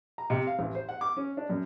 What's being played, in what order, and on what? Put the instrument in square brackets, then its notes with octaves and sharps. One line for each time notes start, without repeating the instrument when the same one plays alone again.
[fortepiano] A#5
C3
F5
A1
C5
F#5
D6
C#4
D4
F#2